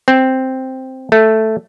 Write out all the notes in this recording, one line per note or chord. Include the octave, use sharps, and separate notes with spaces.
C4
A3